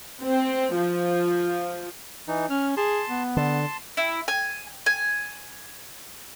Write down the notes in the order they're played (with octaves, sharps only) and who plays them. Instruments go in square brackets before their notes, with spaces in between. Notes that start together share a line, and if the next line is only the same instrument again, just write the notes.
[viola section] C4
F3
[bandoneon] E3 D#4
[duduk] C#4 [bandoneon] F6
[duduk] G#4 [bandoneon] A5 C6
[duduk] B3
[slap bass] D3 [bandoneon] A5 C6
[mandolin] E4
G#5
G#5